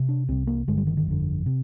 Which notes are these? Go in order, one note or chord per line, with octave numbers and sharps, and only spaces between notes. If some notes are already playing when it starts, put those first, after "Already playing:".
Already playing: C3
D4
C2 C3 C4
A#3
G1 G2 D3 G#3
G3
D#3
D#3
G1 F2 D3
C3